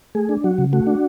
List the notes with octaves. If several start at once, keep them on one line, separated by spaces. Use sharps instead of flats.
A3 G#4
D4
F#3 F#4
C#3
A3 F#4
D4